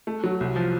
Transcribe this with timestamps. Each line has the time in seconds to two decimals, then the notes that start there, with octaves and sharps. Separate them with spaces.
0.07 A3
0.24 F#3
0.40 C2
0.56 F3